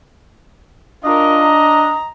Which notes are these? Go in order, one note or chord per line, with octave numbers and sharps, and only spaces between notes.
D4 F4 A#4 D#5
A#5